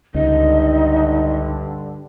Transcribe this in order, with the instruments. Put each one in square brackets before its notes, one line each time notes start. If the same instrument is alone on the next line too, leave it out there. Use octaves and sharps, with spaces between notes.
[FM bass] C#2 [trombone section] G2 D3 [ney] D#4 [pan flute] D#5